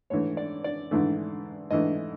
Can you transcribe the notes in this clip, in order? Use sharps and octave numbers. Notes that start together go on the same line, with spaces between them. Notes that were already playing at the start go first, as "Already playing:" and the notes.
G#2 E3 A3 C#5
D5
D5
G#2 E3 A3
G#2 E3 A3 D#5